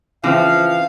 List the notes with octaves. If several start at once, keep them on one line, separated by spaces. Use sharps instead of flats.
C#3 E3 F3 C4 F5